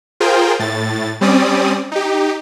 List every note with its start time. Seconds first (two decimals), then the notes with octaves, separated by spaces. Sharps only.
0.20 F4 G#4 A#4 C5 G5
0.59 A2 A6
1.21 G3 C4 C#4 D5 D#6
1.92 D#4 G4